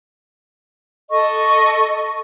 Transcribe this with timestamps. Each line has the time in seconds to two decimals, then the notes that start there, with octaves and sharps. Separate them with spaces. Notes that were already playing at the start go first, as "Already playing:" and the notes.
1.10 A4 D#5 C#6